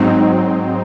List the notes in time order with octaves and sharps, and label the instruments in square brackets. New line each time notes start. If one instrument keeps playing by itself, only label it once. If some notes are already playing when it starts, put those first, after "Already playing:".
Already playing: [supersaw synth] G#2 F#3 C4 D#4